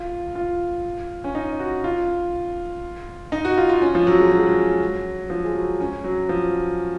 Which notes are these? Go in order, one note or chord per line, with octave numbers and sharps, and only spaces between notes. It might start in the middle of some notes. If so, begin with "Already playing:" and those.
Already playing: F4
F4
C#4
D#4
F#4
F4
D#4
F#4
F4
F4
C#4
F3
F#3
G#3
F#3
G#3
F#3
F3
G#3
F#3
C#4
F#3
F3